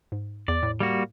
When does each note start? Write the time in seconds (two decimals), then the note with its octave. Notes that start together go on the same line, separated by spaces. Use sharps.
0.12 G#2
0.48 E2 D5
0.63 A2
0.80 G3 A#3 F#4